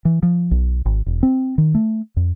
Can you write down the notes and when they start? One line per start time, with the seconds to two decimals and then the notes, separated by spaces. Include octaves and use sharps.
0.05 E3
0.23 F3
0.51 B1
0.85 G#1
1.06 E1
1.23 C4
1.58 D#3
1.75 A3
2.17 F2